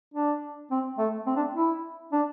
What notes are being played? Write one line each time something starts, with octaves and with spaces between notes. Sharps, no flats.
D4
C4
A3
C4
D4
E4
D4